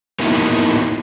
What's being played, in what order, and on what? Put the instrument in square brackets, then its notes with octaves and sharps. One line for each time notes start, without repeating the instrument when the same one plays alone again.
[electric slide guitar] A#3 B3 D#4 E4 F#4